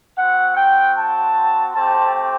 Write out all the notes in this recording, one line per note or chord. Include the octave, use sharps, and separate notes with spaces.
C4 F#4 F#5
G5
A5
A3 C4 G4 A5